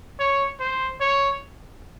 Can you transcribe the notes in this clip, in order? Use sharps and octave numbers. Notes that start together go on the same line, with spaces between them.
C#5
C5
C#5